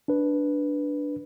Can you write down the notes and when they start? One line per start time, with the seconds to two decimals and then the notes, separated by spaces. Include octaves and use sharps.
0.08 D4 B4